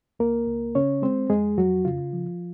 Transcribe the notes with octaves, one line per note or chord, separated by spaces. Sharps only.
C#2 A#3 A#4
C#2
C#3 C#4 C#5
G#3 C4 C5
F2 G#3 G#4
F2 F#3 F#4
C#3 F4
F3